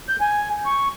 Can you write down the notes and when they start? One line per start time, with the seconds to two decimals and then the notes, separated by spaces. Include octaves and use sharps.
0.09 G6
0.21 G#5
0.66 C#6